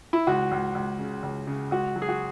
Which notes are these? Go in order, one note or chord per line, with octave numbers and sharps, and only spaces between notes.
E4
C#2 F#4
C#2
C#2
C#3
C#2
C#3
C#2 F#4
F#3
G#4
F#4